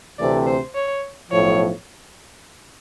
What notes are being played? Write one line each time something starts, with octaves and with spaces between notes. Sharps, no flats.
D2 C3 E3 A3 C4 D5
C5
C#5
B1 A2 F3 C#5